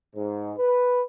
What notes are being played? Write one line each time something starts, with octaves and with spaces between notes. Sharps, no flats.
G#2
B4